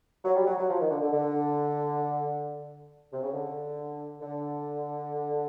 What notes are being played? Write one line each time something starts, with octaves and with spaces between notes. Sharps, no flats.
F#3
G3
F#3
F#3
F3
D#3
D3
D3
D3
C3
C#3
D3
D3